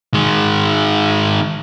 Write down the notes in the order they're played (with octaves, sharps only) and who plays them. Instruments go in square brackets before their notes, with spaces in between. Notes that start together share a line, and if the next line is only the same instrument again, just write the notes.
[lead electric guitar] D#3 G#3